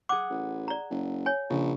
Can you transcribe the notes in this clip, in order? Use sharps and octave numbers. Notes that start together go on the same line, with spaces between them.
G#4 F#5 D6
A1
D5 A#5
F#1
C#5 G#5
A#1 C#3 C#4